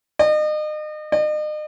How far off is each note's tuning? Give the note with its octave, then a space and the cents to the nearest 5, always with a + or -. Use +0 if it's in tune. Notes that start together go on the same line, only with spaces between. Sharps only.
D#5 -35
D#5 -40